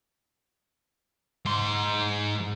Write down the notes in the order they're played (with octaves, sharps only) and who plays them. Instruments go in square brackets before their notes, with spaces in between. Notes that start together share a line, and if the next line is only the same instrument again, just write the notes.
[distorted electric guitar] G#2 C6